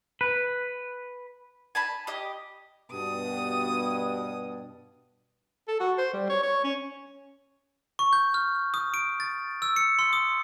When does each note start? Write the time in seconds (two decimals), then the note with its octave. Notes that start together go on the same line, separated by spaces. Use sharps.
0.21 B4
1.75 G#5 A5 B5
2.07 G4 D#5
2.92 G2 B2 D#6
5.68 A4
5.80 F#4
5.98 C5
6.13 G3
6.29 C#5
6.43 C#5
6.64 C#4
7.99 C#6
8.13 G6
8.34 F6
8.74 D#6
8.94 D7
9.20 A6
9.62 E6
9.76 C#7
9.99 C6
10.13 D#6